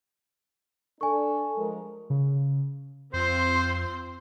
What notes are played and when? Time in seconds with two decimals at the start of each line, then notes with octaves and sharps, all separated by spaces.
1.01 D4 A4 G#5 C#6
1.56 F3 G#3 A#4
2.10 C#3
3.13 F2 C4 F4 C5 C6